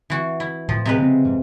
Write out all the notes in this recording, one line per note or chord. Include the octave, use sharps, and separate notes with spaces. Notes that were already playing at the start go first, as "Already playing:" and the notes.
E3 F#4
E4
A2 F3
C3 G#3 B4
C#3 A#3 C4
F2 G#2